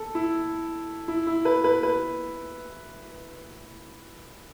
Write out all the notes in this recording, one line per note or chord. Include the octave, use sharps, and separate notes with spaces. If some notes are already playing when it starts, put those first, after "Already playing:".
Already playing: A4
E4
E4
E4
B4
B4
B4